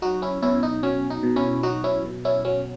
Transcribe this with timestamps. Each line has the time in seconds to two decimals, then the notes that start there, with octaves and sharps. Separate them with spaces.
0.02 F#3 D#4 F#4
0.22 C#4 E4
0.42 B2 C#4 E4
0.63 D#4
0.83 F#3 C#4
1.10 D#4
1.23 B2
1.36 C#4 E4
1.63 F#3 D#4 F#4
1.84 C#4 E4
2.05 B2
2.25 C#4 E4
2.45 F#3 C#4